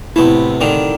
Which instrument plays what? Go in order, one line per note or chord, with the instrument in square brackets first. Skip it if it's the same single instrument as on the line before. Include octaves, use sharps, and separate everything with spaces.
[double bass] A2 C3 [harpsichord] A3 B3 [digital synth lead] E4
[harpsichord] D3 D#3